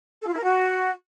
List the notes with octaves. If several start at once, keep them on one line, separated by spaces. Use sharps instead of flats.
A4
F4
E4
A#4
F#4